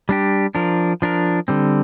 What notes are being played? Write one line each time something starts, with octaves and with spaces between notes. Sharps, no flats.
G3 D4 G4
F3 D4 A#4
F3 D4 A#4
D3 G3 C4